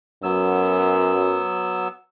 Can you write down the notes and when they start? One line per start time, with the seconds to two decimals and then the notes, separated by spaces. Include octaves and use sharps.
0.23 F#2 F#3 B3 E6